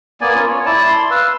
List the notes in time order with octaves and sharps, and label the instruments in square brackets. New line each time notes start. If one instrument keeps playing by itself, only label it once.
[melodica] A#3 B3 D5 G#5
A#3 C#4 F4
C#5
E4 D5 A5
C6
B4 F5 E6